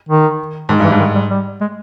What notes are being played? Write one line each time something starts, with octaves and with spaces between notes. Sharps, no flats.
D#3
G#2 D#3
G2 E3
G#2
D#3
G3
G3
G#3